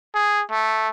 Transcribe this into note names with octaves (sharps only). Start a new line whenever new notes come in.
G#4
A3